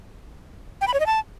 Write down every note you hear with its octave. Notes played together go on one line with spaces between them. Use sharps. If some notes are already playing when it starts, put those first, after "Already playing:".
G5
B5
C#5
D#5
A5